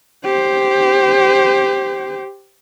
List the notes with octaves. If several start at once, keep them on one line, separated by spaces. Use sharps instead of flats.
G4 C5